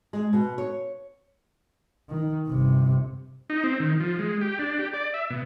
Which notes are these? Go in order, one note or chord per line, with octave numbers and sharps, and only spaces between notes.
G#3
B2
C#5
D#3
G1 C3
D#4
C4
D#3
F3
G#3
G4
D4
G4
D5
E5
B2